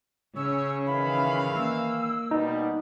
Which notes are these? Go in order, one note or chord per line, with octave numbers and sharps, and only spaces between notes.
C#3 C#4 C#5 E6
D#3 E3 F5 B5
A#3 E6
B2 G3 D#4